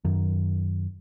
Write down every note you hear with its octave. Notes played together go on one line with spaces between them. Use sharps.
F#2 D#3